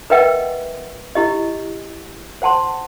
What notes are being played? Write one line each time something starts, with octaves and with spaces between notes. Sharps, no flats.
A#4 B4 D#5 E5 F#5 G5
E4 G4 D#5
C5 F#5 A5 C6